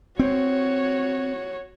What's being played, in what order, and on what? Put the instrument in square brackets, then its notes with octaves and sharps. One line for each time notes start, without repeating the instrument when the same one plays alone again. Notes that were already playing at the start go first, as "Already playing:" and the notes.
[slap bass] C4 [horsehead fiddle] F#4 C#5